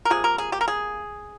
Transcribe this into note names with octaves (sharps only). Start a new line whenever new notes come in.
A#4
C3 F3 A#3 G#4
A#4
G#4
G4
A#4
G#4